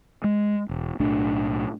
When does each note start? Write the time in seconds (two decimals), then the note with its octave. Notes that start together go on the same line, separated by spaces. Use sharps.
0.24 G#3
0.69 E1
1.00 B1 A2 A3 D4